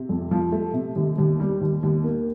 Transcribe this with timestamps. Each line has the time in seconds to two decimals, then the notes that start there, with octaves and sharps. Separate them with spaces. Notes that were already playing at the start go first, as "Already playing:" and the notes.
Already playing: C3
0.09 F2
0.31 F3
0.52 A3
0.74 C3
0.96 D#2
1.18 D#2
1.40 G3
1.61 D#2
1.83 D#2
2.04 A#3